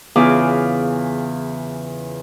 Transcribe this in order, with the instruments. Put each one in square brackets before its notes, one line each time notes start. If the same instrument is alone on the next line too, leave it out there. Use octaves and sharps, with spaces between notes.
[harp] E2 C#3 E3 F4 D6